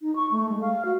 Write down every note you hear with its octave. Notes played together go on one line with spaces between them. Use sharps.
D#4
C#6
A3
G#3
F5
F#4